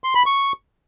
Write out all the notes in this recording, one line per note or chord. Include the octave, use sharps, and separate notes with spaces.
C6
B5
C#6